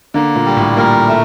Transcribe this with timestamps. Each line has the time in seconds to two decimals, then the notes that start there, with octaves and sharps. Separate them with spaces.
0.14 D3 A#3
0.36 A#2
0.46 G3
0.57 A2
0.77 A#2 A#4
1.08 A3